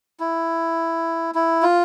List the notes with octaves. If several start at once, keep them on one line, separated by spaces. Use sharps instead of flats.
E4
E4
F4